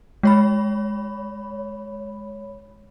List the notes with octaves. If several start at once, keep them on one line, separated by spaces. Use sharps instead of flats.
G#3 C#5 B5